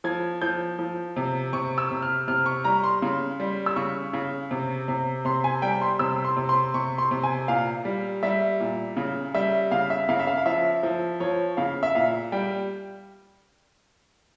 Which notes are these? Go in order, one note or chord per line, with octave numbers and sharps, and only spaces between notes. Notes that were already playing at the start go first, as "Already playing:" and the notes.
F3 G#6
F3 G6
F3
C3
C3 C#6
E6
C3
F6
C3 F6
C#6
G3 A#5
C6
C#3
G3
E6
C#3 C#6
C#3
C3
C3
C3 C6
G#5
G3 G5
C6
C3 E6
C6
C3
C6
C3 C#6
C6
C3
G#5
A#2 F5
G3
G3 E5
A#2
C#3
G3 E5
C#3 F5
E5
C#3 F5
E5
F5
F5
F3 E5
F3
F3 C#5
C#3 F5
E5
A#2 F5
G3 G5